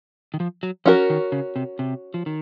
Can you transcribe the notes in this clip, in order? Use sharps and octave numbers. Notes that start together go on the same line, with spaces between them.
D#3
F3
F#3
F3 C#4 F#4 A#4
D#3
C#3
C3
C3
F3
D#3